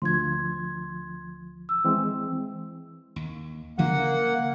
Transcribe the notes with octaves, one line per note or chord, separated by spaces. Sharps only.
D2 F3 C6 G#6
E6
E3 G#3 C4
D#2
C#3 E3 F3 A#3 F#5